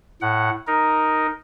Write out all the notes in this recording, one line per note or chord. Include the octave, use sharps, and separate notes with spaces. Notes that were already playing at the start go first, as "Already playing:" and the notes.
A2 F#5
D#4 A#4